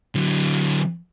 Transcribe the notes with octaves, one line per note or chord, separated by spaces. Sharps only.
D3 F#3